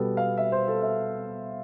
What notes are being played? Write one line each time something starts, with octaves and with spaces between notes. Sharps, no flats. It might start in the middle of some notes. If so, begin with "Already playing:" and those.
Already playing: B2 G3 B3 A4
F5
E5
C5
A4
E5